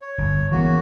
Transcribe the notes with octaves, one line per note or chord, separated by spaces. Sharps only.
C#5
G1
C#3 E3 A#3 B3 F#4